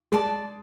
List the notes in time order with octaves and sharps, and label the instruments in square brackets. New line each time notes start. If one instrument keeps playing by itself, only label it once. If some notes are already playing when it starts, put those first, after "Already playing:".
[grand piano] G#3 [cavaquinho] D5 A5 D6